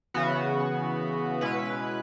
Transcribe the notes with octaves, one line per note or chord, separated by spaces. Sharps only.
C#3 E3 B3 F#4
B2 G#3 C#4 E4 B4